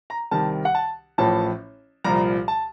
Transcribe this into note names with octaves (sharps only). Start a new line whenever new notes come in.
A#5
C2 C3 D#3 A5
F#5
A5
A1 A2 F3 A5
C2 A#2 F3 A#5
A5